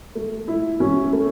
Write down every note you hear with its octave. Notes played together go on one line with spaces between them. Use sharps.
A3
E4
C#4
A3